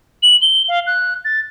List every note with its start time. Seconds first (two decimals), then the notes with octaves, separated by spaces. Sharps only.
0.23 F#7
0.42 G7
0.68 F5
0.87 F#6
1.25 A6